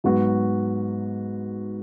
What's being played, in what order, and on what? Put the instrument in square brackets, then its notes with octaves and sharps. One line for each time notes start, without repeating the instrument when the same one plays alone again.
[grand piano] G#2 F#3 B3 F#4